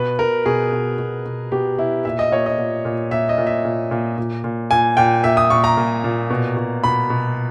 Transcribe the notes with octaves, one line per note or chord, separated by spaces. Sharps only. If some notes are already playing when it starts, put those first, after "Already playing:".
Already playing: B2 B4
B2 A#4
B2 G#4
B2
B2
B2
B2 G4
B2 E4
A#2 E5
D#5
A#2 C#5
D#5
A#2
A#2
A#2 E5
D#5
A#2
E5
A#2
A#2
A#2
A#2
A#2 G#5
A#2 G5
A#2 E5
D#6
A#2 C#6
A#5
A#2
A#2
B2
B2
B2 B5
B2